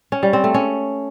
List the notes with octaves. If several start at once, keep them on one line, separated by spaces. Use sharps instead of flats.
C#4
G3
C4
A3
C#4